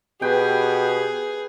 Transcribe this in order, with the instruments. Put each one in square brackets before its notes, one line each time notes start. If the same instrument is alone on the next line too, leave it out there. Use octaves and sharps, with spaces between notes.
[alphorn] B2 [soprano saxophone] G4 [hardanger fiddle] G#4 [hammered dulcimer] B4 G5